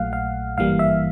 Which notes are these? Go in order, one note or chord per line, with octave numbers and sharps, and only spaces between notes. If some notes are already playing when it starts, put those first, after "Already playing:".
Already playing: A#1 A#2 F#3 A3 F5 F#5
F5
G#1 G2 E3 G3 A#3 F5
E5